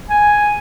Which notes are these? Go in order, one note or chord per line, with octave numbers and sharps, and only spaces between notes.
G#5